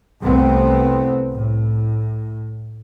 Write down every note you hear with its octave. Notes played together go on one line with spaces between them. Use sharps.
C2 A3 B3 C4
A2